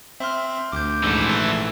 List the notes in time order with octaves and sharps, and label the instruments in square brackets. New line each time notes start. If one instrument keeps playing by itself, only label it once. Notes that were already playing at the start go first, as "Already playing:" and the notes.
[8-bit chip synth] C4 [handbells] E5 C6 F6
[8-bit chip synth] D2 [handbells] D6 G6
[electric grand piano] A#1 G#2 [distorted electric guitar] E3 A4
[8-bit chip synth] A3 [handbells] A6